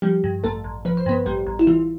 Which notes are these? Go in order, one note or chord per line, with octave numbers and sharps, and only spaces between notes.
F3 G3 G4
G2
A1 A3 A4
A1
F3 B4
C5
G2 B3 B4
A1 G3 G4
A1
E4
E3 F4